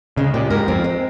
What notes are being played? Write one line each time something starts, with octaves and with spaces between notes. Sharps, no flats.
C#3 G#3
A#2 G4
G#2 A#4
F2 C4
G#3